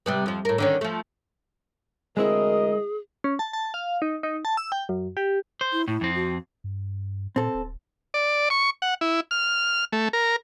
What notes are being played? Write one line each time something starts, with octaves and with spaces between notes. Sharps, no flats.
C3 G3 B3
F2 F3
A2 A#4
D3 D#3 C#4
F3 A3
D2 E3 G#3 C4 E4 G#4 A#4 D#5
C#4
A5
A5
F5
D#4
D#4
A5
E6
G5
F#2
G4
C5
E4
A2 E4
F2 C4
F#4
G2
A#2 C4 A4
D1
D5
C#6
F#5
E4
F6
A3
A#4